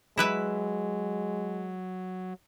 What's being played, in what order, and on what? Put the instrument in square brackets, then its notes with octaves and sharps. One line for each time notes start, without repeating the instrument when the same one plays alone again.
[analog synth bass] F#3 [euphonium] G#3 [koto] E4 B4 E5